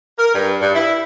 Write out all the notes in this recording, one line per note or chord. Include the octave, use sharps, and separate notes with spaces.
A#4
G2
G2
E4